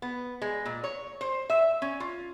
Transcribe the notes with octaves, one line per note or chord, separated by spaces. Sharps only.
B3
G#3
A#2
C#5
C5
E5
C#4
F4